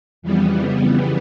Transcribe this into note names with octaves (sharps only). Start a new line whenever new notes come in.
F2 C#3 E3 G3 B3